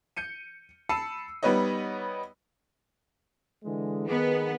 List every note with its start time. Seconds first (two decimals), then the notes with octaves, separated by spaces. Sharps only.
0.16 G6 C#7 D#7
0.89 A5 B5 E6 C7 C#7 D#7
1.43 G3 B3 D#4 B4 C#5 D#5
3.64 D3 E3 G#3
4.08 D#3 B3 D#4 G#4